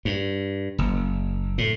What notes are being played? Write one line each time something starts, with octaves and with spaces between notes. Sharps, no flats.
G2
F#1
A2